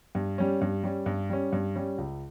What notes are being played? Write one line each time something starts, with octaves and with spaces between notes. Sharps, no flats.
G2
G3 C#4
G2
G3 C#4
G2
G3 C#4
G2
G3 C#4
C#2